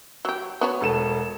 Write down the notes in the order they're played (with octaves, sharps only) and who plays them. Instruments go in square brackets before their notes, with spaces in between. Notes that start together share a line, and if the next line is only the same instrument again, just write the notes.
[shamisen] F#3 G4
B3 F#4 C#5
[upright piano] E1 A4 E7